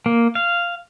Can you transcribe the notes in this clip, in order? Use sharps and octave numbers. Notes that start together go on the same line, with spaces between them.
A#3
F5